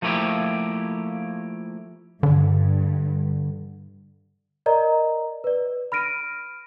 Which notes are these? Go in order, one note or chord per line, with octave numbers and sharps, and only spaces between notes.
F3 A3 A#3 E4 G4
G2 D3
A#4 D5 D#5 A#5
B4 D5
B5 F6 A#6 D7 D#7